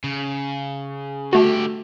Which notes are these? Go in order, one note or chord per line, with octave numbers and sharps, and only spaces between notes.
C#3
D3 A3 F#4 G4